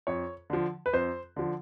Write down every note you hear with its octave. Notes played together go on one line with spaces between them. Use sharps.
F2 C#5
D3 F3
B4
F2 C5
D3 F3